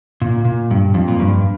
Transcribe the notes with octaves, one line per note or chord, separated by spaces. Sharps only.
A#2
A#2
G2
F2
A#2
G2